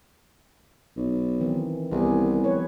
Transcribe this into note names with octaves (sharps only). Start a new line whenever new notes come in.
B1
D#3 E3 C4
C2 B3 G4 G#4
F3 B4 C#5